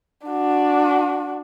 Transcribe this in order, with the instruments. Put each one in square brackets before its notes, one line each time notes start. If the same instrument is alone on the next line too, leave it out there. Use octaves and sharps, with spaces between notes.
[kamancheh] D4 F#4